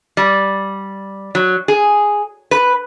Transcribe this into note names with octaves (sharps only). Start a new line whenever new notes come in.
G3
F#3
G#4
B4